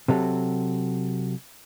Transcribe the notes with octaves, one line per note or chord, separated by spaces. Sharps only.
C3 F#3 A4